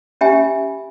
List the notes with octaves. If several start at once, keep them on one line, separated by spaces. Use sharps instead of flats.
C#4 G4 E5 G#5 B5